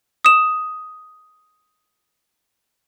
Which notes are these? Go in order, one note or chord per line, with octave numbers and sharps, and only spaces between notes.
D#6 E7